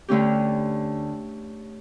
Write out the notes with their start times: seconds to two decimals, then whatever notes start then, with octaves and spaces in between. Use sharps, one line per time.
0.08 D2 D3 A3 C#4 G4